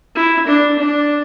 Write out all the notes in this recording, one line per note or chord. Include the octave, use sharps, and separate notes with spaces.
E4
D4
D4